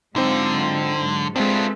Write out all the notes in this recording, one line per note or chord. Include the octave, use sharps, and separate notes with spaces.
G#2 D3 F#3 C4 D#4 F4
G#2 F#3
G#3 C4 D4 F4 A4 B4 E5